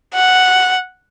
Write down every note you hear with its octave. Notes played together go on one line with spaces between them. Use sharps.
F#5